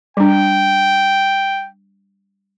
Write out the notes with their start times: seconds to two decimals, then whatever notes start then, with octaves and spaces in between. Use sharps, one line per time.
0.17 G3 D4 G5